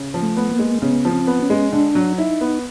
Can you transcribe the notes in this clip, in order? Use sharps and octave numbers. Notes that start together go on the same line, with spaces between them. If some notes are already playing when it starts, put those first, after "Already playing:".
Already playing: C#3
F3
A3
B3
A#3
G#3
C#3 B3
F3
C4
B3
C#4
G#3
D3 D4
F#3
D#4 E4
B3